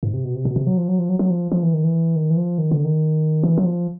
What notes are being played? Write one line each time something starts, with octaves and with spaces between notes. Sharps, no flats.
G#2
C3
B2
C3
B2
C3
F#3
F3
F#3
F3
F#3
F#3
F3
F3
E3
D#3
E3
D#3
E3
F3
D#3
D3
D#3
E3
F#3
F3